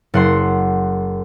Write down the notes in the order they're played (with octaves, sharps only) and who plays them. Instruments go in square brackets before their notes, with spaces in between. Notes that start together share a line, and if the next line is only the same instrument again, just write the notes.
[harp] F#1 F#5 C6